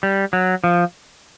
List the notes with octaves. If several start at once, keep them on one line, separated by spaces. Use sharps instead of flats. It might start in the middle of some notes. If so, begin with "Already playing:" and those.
G3
F#3
F3